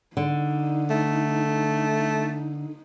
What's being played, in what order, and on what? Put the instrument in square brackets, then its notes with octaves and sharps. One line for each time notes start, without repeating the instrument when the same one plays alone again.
[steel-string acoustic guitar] D3 [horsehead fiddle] D#4
[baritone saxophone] A3